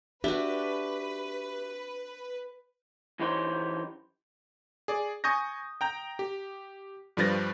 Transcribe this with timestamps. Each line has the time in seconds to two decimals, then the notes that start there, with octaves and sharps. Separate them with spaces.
0.24 D4 F#4 G4 B4 E5
3.20 F#2 E3 D#4 G4 C5 C#5
4.88 G#4 D5
5.24 G#5 C#6 D#6 G6 A#6
5.81 G5 A#5 G6
6.19 G4
7.17 G2 F3 G3 B4 A6 A#6